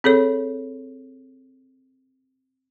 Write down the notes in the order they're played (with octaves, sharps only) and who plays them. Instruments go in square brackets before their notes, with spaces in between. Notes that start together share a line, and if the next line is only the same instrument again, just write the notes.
[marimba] C4 G#4 A4 C#5